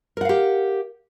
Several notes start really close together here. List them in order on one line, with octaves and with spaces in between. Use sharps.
A#4 F#5 F5 G4